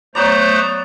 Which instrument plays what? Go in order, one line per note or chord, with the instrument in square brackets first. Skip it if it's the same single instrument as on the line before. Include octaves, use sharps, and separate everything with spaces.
[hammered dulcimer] F#3 B3 D5 [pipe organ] A3 C5 A#5